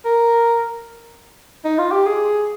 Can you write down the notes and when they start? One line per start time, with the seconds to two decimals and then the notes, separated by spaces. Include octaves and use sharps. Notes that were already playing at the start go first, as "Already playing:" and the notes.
0.05 A#4
1.64 D#4
1.78 F4
1.92 G4
2.06 G#4